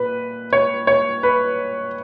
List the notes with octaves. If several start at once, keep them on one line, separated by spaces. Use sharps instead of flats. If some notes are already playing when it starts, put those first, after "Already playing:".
Already playing: A#2 B4
C#5
C#5
B4